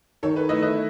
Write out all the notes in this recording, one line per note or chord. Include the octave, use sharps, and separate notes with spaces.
D#3 A4 C#5
B4
A3 E4 B4 D#5
B4 D#5